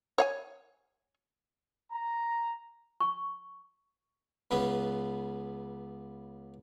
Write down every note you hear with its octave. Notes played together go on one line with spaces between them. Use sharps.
C#5 F5 G#5
A#5
C#6
C#2 C#3 B3 C#4 B4